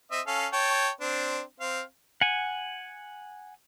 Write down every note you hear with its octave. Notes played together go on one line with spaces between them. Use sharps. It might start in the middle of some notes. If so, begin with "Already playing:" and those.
C4 D#5 E5
C#4 A4 F5
C#5 G5 A5
C4 D4
C4 F5
F#5 G#5